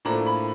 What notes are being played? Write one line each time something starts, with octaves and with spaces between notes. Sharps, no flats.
A2 F3 A#3 D4 A#5
B5